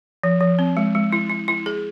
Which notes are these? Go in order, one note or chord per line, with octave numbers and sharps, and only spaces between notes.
F3
F3
C4
G#3
G#3
E4
E4
E4
G#4